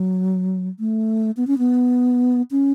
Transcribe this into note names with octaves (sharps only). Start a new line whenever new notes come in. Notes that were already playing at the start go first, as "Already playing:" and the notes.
Already playing: F#3
A3
B3
C#4
B3
C#4